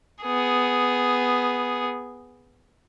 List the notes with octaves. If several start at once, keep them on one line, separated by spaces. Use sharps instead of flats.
B3 G#4